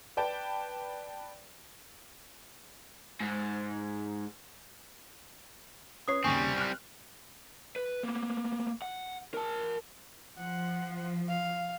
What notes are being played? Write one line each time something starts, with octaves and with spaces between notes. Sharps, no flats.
B4 D5 G5 A5
G#2
C#4 B4 C#5 D#6 C7
D#2 C#3 G3 C4 G#5 C#6
F6 F#6
B4
A#3 B3
F#5
A#4 A5
F3 F#5
F5